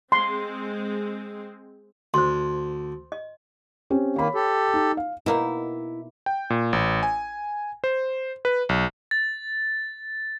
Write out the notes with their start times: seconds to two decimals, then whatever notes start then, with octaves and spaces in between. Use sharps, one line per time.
0.12 G#3 C4 C6
2.14 D2 C5 C6
3.12 D#5
3.90 C4 C#4 G4
4.16 D#3 A#3 C#5 B5
4.34 G4 A4
4.74 D#4
4.97 F5
5.26 B2 A#3 D#4 E4
6.26 G5
6.50 A#2
6.73 A1
7.03 G#5
7.84 C5
8.45 B4
8.69 B1
9.11 A6